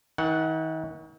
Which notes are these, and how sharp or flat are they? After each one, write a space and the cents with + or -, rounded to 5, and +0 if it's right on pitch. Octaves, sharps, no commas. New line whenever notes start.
D#3 +40 F#5 +0